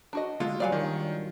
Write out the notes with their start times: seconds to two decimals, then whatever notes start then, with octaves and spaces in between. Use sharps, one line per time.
0.13 D4 F#4 D#5
0.40 A#2 D3 G#3 F4
0.60 G2 A#2 F#3 D5 F5 G#5
0.72 D#3